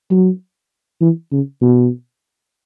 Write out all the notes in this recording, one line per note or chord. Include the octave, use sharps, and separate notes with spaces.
F#3
E3
C#3
B2